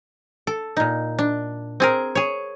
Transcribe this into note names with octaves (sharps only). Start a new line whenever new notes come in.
A4
A#2 D#4
D4
C4 G#4 A#4
G#4 C#5